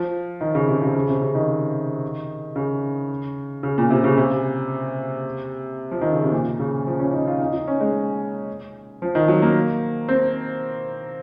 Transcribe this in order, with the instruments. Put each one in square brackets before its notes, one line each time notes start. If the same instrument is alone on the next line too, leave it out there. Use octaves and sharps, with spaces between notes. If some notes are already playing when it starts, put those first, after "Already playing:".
Already playing: [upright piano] F3
D#3
C#3
C3
C3
C#3
C3
C#3
D#3
C#3
C#3
A#2
C3
C#3
C3
F3
D#3
C#3
C3
A#2
C#3
F3
C#4
D#4
F4
D#4
D#4
C#4
G#3
F3
D#3
F#3
A#3
C4